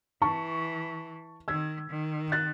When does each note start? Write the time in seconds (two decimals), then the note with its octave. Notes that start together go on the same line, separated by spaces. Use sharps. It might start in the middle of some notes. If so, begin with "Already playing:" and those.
0.22 E3 A5 C#6
1.48 D#3 E6 G#6
1.90 D#3
2.32 F#6 A6